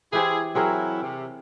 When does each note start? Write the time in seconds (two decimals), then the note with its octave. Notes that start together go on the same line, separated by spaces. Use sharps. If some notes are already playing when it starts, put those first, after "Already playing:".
0.13 E3 E4 G4 G#4 C5
0.55 F#3 C4 E4 G#4 A#4
1.03 C3